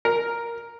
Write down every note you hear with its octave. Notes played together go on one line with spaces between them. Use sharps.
A#4